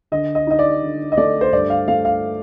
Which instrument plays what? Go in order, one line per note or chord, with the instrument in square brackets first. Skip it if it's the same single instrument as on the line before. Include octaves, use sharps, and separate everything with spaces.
[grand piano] D3 D#5
D#5
D#4 D#5
D5
D3
D#5
A3 D5
C5
G2 D5
F5
A3 F5
F5